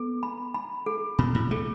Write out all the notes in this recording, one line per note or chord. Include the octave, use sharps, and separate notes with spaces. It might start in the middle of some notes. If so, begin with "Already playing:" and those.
Already playing: B3 A4
B5
B5
A4
B2 B5
A2
A3 A4